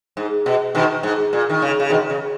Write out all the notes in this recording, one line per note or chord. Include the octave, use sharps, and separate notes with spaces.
G#2
B2
B2 D#3
G#2
A#2
D#3
C#3
C#3
B2 D#3
C#3